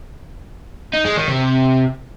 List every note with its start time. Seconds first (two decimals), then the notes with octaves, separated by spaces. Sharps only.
0.93 D#4
1.05 G#3
1.16 D#3
1.28 C3